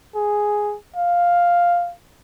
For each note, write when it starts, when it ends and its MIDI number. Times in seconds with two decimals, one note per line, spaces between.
0.15 0.76 68
0.96 1.92 77